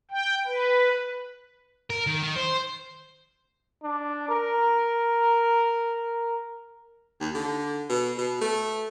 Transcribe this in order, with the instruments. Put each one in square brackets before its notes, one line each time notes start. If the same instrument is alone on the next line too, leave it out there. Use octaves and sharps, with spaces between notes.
[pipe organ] G5
B4
[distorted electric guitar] A#4
D#3
D#3
C5
[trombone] D4
A#4
[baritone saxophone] D#2
D3
B2
B2
A3